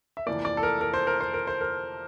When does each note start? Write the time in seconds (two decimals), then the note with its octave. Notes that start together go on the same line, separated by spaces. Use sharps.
0.17 E5
0.26 F1 F2 E3 A#3 D5
0.45 D5
0.57 A4
0.63 A#4
0.81 A#4
0.94 C5
1.07 A#4
1.21 C5
1.34 A#4
1.47 C5
1.61 A#4